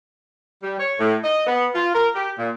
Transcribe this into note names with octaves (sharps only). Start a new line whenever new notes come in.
G3
C#5
A2
D#5
B3
F4
A#4
G4
A#2